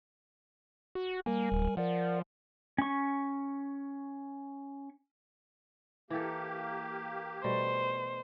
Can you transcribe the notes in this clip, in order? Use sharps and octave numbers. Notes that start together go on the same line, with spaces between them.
F#4
G3 A#3 A#4 G#5
D1
F3 A#4 D5 F#5
C#4 C#6
E3 A#3 G4 A4
B2 G3 A3 C5